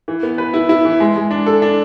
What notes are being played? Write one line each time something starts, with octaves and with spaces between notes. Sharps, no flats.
E3
B3
B4
E4
E4
E3
G#3
G#3
D4
A4
D4